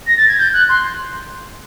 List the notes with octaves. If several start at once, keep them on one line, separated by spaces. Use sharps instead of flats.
A#6
A6
G#6
G6
F#6
C6